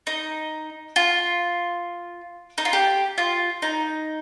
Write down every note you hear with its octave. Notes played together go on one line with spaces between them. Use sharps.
D#4
F4
D#4
F4
G4
F4
D#4